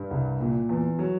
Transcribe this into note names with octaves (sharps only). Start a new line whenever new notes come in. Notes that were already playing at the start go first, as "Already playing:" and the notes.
Already playing: G2
C2
A#2
E2
F#3